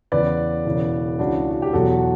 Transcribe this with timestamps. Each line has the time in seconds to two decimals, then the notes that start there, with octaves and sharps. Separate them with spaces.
0.12 E2 C#3 E3 B4 D5
0.65 E1 E2 C#3 E3
1.19 C#2 C#3 E3 D4 F#4
1.51 F#4
1.62 G4
1.73 E2 B2 F#3 F#4 A4